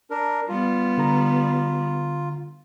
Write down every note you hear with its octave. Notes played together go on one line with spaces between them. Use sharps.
D4 A#4
G3 B3 F4
D3 A#5